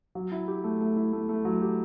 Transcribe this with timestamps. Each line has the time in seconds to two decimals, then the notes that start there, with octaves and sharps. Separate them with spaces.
0.15 F#3
0.32 E4
0.48 G4
0.64 A3
0.80 A3
0.97 E4
1.13 A3
1.29 A3
1.45 F#3
1.62 G4